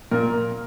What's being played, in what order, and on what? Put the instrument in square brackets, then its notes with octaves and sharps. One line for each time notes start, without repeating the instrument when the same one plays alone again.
[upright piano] A#2 A#4